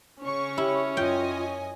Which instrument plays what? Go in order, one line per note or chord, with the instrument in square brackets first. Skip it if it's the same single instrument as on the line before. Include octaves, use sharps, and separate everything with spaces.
[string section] C#3 C#6 [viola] C#4 C#5
[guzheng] E4 [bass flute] G4
[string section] F#2 D#5 G#5 [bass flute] F4 [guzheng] G5